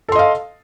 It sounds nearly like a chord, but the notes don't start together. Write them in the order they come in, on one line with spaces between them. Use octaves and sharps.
A4 C6 D#5 F5